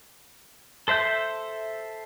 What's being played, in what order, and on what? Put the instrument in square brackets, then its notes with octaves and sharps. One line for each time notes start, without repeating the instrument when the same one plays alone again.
[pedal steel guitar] A4 C5 E5 G6